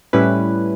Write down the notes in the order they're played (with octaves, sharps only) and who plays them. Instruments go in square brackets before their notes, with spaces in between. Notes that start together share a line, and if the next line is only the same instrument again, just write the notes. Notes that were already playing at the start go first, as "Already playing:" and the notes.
[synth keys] A2 G3 C#4 E4 B4